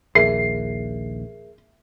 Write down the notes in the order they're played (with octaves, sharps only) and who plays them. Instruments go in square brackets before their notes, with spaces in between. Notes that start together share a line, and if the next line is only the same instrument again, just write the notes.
[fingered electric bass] A#1 D#2 [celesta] G#4 A#4 E5 [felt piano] C7